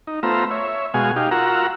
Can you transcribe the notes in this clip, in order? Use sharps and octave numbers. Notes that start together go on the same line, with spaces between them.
D#4
A3 B3 F4 C5 A#5 E6
C#5 E5
B2 G#3 F#4 F5 G#5
D#4 G4 F5
F4 F#4 A#4 F#5 A#5 E6